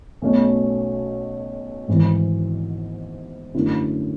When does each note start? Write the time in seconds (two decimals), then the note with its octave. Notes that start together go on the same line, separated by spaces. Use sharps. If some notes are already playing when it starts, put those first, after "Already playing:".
0.22 B1 B2 A3 C#4
1.88 G#1 G#2 E3
3.54 F#2 D3 A3 E4